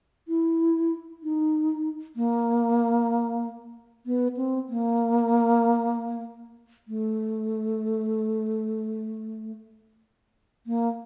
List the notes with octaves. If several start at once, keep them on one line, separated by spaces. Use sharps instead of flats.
E4
D#4
A#3
B3
C4
A#3
A3
A#3